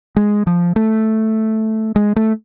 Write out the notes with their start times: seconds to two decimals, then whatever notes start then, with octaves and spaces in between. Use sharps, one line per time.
0.16 G#3
0.47 F3
0.76 A3
1.96 G#3
2.16 A3